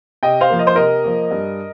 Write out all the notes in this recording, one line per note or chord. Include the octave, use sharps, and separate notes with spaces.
C3 D#5 G5
C5 F5
F3 A#3
D#5
C5
C3 A#4 D#5
F3 A#3
G2